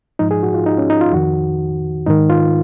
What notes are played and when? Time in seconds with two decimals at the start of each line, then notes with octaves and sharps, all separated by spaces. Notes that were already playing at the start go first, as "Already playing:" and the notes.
0.19 G#2 F3 D#4
0.31 G#4
0.43 F#4
0.54 F4
0.66 D#4
0.78 C#4
0.90 D#4
1.01 F4
1.13 F2 D#3 F#4
2.06 G#2 D#3 D#4
2.30 F4